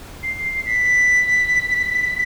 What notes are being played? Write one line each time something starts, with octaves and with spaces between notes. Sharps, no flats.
C7
B6